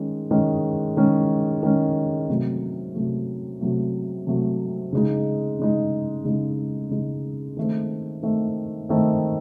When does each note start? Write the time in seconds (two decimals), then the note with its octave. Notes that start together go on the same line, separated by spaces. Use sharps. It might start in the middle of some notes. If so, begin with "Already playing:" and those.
Already playing: D#3 G#3 C#4
0.31 D#3 G#3 C#4
0.97 D#3 G#3 C#4
1.63 D#3 G#3 C#4
2.29 C3 F#3 A3
2.95 C3 F#3 A3
3.61 C3 F#3 A3
4.27 C3 F#3 A3
4.93 C#3 G#3 D#4
5.59 C#3 G#3 D#4
6.25 C#3 G#3 D#4
6.91 C#3 G#3 D#4
7.57 D#3 A3 C4
8.23 D#3 A3 C4
8.89 D#3 A3 C4